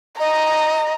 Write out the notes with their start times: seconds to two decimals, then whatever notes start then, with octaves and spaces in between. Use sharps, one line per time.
0.20 D#5 A#5